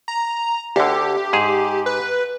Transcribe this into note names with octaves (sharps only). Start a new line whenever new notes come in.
A#5
D2 D3 G4
G#2 G#4
B4